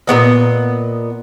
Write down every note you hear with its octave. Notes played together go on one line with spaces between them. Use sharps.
A#2 G3 B3 D#5